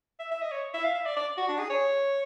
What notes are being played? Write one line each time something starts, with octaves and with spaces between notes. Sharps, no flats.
E5
E5
D#5
C#5
E5
F5
E5
D5
D5
F#4
D4
G#4
C#5